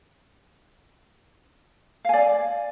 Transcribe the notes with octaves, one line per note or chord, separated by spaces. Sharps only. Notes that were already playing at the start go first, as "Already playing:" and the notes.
D5 F5 G#5